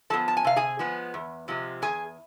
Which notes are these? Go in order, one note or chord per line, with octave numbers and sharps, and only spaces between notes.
F3 G#3 B3 A4 A5
A5
G#5
C3 F5
G#4 G#5
F3 G#3 B3
E2
C3 F3 G#3
E2 G#4 G#5